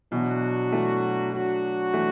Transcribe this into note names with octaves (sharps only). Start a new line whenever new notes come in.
B2 E3 F#3 D4 F#4
E3 A3
F#3 D4 F#4
E3 A3